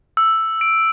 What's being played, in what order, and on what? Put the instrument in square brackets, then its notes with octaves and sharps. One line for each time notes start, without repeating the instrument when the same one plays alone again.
[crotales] E6
D7